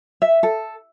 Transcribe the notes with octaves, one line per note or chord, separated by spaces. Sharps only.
E5
A4